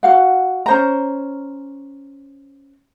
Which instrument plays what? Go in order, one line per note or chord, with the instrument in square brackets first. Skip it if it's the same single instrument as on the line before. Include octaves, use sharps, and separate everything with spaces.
[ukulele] F#4 F5 F#5
C#4 C5 A#5